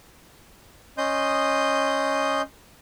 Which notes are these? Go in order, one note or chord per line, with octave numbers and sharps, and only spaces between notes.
C#4 D#5 C6 D#6 G6